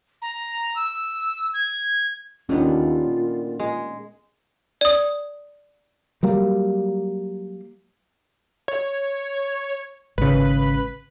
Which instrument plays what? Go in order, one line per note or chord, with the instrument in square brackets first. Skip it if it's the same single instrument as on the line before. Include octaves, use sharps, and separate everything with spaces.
[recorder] A#5
E6
G#6
[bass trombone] D#2 [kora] D3 D#3 B3 [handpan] C#4 D4 [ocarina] F4
[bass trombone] A#2
[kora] G#3
[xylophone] D5 D#6
[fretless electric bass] F#3 G3 A#3
[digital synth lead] C#5
[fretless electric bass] G#1 C#3 [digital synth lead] B4